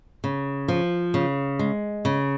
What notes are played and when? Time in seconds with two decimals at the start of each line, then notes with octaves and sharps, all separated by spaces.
0.24 C#3
0.68 F3
1.14 C#3
1.59 G#3
2.05 C#3